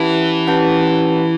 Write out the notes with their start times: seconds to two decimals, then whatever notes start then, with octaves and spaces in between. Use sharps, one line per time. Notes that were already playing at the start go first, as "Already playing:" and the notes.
Already playing: E3 C#4 G4 B4 F#5 A5
0.48 C#4 G4 B4 F#5 A5